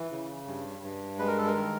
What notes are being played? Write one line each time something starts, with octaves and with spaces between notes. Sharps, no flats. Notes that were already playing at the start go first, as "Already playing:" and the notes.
Already playing: E3
C#3
G2
G2
G#3 B4
A#4
A4
A#4
D#3